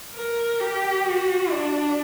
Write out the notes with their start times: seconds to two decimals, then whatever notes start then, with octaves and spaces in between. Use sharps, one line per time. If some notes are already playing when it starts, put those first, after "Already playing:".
0.14 A#4
0.60 G4
1.05 F#4
1.51 D4